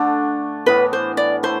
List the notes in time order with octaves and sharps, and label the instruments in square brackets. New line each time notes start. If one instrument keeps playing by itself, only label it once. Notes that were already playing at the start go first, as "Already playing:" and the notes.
Already playing: [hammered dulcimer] D3 A3 D4
[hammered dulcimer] A2 E3 B3 [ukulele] B4
[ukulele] C5
D5
[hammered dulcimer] A3 E4 [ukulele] C5